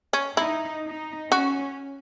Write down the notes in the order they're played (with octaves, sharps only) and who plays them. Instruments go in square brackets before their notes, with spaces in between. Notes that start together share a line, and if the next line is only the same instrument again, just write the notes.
[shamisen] C#4
[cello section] D#4 [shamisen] E4
[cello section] D#4
[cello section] C#4 [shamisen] F#4